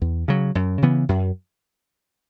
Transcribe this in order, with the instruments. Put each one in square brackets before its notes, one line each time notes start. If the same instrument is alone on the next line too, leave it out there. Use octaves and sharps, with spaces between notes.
[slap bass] E2
C#3 F#3
F#2
C#3 E3 B3
F#2